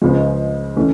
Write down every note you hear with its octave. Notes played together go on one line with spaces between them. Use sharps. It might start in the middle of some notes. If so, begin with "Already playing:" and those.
C#2 C#3 F3 G#3
E3 A3 C#4